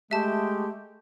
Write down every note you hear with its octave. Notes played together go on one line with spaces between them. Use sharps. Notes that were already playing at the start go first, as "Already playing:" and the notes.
G#3 A3 G4 E5 A5